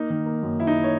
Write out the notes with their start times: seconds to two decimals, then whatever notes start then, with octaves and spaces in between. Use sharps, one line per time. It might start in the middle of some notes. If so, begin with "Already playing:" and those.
Already playing: A#3 D#4
0.10 D#3
0.26 A#3
0.43 F#2
0.59 D#3 E4
0.67 D#4
0.84 C#5